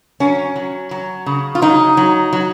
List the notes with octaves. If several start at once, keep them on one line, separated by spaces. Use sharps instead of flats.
F#3 C#4
F#3
F#3
C#3
F4
F#3 D#4
F#3
F#3